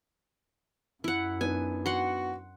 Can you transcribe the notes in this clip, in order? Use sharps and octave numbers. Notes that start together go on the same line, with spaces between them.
F#2 E4 F#5
B3 D4 D#4 G#5
F#4 F#5 C6